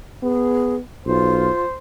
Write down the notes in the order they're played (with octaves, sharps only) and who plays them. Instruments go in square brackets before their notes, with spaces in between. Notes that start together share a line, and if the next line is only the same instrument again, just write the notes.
[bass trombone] B3 [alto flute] G#4
[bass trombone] B1 [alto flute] F4 [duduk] C5